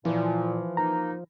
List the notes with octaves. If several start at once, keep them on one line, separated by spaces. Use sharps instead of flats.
A#2 E3 F3
A#3 D#4 A#5